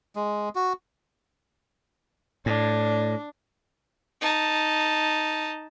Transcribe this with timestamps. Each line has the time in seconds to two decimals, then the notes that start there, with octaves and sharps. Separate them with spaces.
0.16 G#3
0.55 F#4
2.46 A2 D4
4.22 D#4 A5